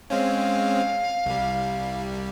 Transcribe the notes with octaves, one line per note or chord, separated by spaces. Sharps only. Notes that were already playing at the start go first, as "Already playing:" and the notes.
G#3 C4 C#4 F5
C2 G3